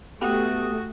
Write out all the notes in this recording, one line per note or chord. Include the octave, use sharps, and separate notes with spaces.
A3 B3 F#4 G4 D#6